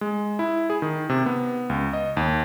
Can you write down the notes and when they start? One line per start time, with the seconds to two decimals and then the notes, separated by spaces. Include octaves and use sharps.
0.01 G#3
0.39 E4
0.70 G#4
0.82 D#3
1.09 C3
1.26 B3
1.70 C#2
1.93 D#5
2.17 D#2